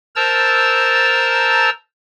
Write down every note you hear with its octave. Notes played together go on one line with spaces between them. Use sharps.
A#4 C5 A5 A#5 E6 A6